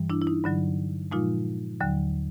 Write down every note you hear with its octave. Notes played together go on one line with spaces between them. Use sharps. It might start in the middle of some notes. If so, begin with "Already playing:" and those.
Already playing: G2 E3 G3
D4 E4
E4
D#4
G2 D3 F#3
A#2 F3 G#3 D#4 F4
D#2 D3 F#3